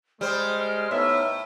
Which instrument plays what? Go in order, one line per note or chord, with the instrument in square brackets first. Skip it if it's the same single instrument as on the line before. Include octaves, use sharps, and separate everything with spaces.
[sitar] G3 C5 [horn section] G#3 [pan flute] F6
[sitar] A2 [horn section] B3 D#4 E5 [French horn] C#5